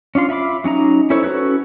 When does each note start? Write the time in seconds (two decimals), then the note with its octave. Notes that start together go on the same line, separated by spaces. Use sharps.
0.15 C#4 D4 F4 C6
0.29 F4 E5 B5 D6
0.64 F#3 C#4 D#4 A#5
1.10 C#4 E4 A4 C5 C#5
1.23 C#4 F#4 A4 B4 C#5